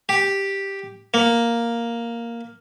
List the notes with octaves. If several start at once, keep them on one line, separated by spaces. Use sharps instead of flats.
G4
A#3